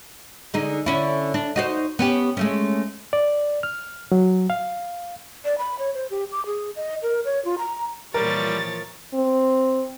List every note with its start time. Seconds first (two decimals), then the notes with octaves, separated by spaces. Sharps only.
0.54 D3 G#3 D#4
0.86 D3 C#4 E4
1.34 D4
1.56 D#4 F#4 C5
1.99 B3 C#4 G4
2.37 G#3 A3 C#4
3.13 D5
3.63 F6
4.12 F#3
4.50 F5
5.45 D5
5.58 B5
5.79 C#5
5.94 C5
6.10 G4
6.32 D6
6.46 G#4
6.76 D#5
7.03 A#4
7.25 C#5
7.45 F4
7.58 A#5
8.14 A#2 E3 F3 G3 A#4 C#5 A6
9.14 C4